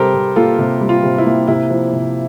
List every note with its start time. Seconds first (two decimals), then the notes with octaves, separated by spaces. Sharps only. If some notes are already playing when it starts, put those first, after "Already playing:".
Already playing: C3 G3 G4 A4 A#4 C5
0.14 C3
0.36 A#3 F4 A4
0.59 C3
0.81 G3
0.89 F4
1.03 C3
1.18 E4
1.26 A#3
1.48 C3 E4
1.70 F3
1.93 C3